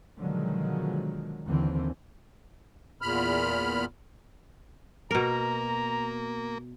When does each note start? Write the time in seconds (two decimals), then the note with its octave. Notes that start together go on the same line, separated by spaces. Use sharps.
0.19 B2 D3 D#3 F3 F#3 G#3
1.46 D#2 D3 E3 C4
3.02 E2 A#2 B5 F6
5.11 B2 A#3 A#4 A#5